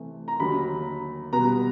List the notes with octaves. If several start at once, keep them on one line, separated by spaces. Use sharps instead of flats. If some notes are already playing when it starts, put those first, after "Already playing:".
Already playing: C3 E3 A3
A#5
D#2 D3 F#3 A#3 B5
B2 G3 B3 A#5